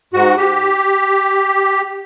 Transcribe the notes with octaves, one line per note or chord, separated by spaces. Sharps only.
G#2 F#4
G4